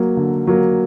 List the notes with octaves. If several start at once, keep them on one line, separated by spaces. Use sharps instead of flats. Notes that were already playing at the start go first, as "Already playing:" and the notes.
Already playing: F#3 A#3
D3
F#3 A#3